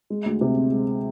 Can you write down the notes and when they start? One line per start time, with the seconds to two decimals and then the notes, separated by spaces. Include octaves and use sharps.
0.10 G#3
0.25 D2
0.41 C3
0.57 C4
0.72 G#3